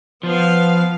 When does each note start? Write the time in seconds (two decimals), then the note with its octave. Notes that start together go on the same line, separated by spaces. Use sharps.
0.23 F3 B3 F5